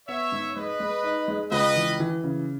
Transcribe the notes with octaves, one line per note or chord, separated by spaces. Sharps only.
B3 C#5 E5
G#2
G#3 B4 D#5
G#3
D#4
G#3
C#2 B4 D#5
E3
E3
C#3